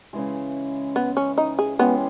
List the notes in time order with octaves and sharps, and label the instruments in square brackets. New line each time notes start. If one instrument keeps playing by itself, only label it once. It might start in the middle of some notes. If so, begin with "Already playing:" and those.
[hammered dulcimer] C#3 E3 G#3
[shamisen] B3
C#4
D#4
G#4
[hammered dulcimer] E3 G#3 C#4 G4 [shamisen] B3